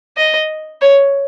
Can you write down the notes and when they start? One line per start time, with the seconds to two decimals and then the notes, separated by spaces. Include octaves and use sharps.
0.17 D#5
0.82 C#5